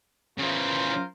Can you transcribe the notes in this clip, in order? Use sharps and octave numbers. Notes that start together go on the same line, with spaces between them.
C#3 E3 F4 A#4 C5